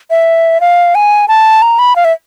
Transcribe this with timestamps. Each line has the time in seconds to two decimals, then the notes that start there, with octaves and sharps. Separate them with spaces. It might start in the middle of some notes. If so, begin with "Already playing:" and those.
0.10 E5
0.61 F5
0.95 G#5
1.28 A5
1.62 A#5
1.79 B5
1.96 F5
2.05 E5